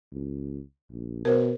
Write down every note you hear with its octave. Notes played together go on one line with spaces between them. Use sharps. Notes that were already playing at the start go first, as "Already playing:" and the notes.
C#2
A#1
B2 A#4 C5